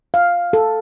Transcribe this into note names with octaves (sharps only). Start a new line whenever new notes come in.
F5
A4